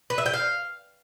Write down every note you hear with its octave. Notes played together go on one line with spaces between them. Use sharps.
B4
E5
G5
F5